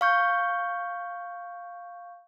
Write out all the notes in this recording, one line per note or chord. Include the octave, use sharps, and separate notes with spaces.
F5 C#6 G6